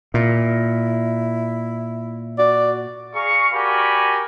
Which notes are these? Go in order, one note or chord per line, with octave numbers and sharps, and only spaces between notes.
A#2 E4
F#4 D5
G#4 F5 A#5 C#6
F#4 G4 A#4 D5 G#5 B5